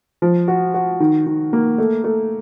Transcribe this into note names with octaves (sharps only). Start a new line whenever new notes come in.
F3
F#4
F#4
D#3
D#3
A#3
A3
A3